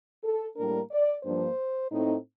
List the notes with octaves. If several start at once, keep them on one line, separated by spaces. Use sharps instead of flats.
A4
A2 G3 A#3 D4 A#4
D5
G2 F3 A#3 D4 C5
A2 A3 C4 D#4